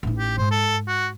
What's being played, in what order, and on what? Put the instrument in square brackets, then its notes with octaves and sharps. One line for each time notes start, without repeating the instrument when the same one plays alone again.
[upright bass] A1 D#4
[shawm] G4
[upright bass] G#2 [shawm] C5
[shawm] A4
F#4